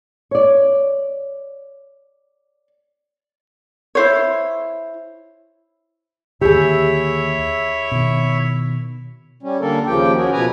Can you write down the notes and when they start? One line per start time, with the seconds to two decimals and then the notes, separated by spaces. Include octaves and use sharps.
0.31 C#5 D5
3.95 E4 C5 C#5
6.41 D#2 D3 E4 G4 G#4 C#5 E5
7.92 B2 D#3
9.43 G3 C#4
9.60 D3 G3 A#3 A4 A#4
9.86 D#2 C#3 F3 G4 G5
10.16 C#4 F#4 G#4 A#4
10.33 B2 F3 B4 G#5 A#5